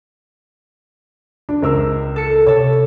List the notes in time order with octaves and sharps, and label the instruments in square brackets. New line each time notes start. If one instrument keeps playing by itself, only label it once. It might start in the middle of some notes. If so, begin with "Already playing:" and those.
[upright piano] D4
C#2 A#4 E6
[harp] A4 C#7
[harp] C3 A4 [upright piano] C#5